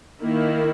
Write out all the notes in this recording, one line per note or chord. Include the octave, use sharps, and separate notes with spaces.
D#3 A#3 E4